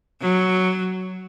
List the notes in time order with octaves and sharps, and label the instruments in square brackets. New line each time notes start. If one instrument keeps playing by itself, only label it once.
[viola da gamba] F#3